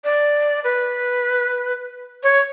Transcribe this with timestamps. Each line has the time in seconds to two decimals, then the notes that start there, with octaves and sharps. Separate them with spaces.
0.04 D5
0.64 B4
2.23 C#5